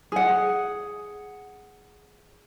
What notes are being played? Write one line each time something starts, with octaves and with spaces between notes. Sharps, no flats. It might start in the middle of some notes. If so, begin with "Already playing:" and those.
G#4 F#5